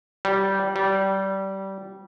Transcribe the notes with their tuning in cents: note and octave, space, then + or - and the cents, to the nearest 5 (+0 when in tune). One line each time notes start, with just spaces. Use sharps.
G3 -15
G3 -20